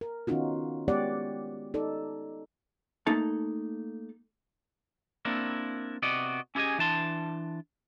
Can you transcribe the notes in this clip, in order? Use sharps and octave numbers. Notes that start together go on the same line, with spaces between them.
A#4
D#3 B3 C#4 D#4 F4 F#4
G#3 B3 G4 C#5 D5 F#5
D#4 A4 D5
A3 A#3 D#4 A4 A5
A#3 C4 D4 E4 A#4
C3 B3 F#4 D5 D#5
C#4 E4 G4 G#4 D#5 G#5
E3 D4 A5 C6